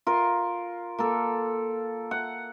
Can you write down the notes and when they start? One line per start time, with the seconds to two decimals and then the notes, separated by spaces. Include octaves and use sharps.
0.07 F4 A#4
0.99 A#3 A4
2.11 F#5